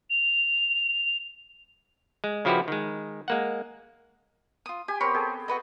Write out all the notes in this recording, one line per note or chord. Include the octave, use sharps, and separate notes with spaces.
F7
G#3
C#3 F3 E4 F#4 G4 B4
D#3 G#3
G#3 A#3 F#5
F4 D#6
G4 G#5
B3 C4 A#4 C#5 B5 C6
G#4 A4 G5
F#4 B4 D#5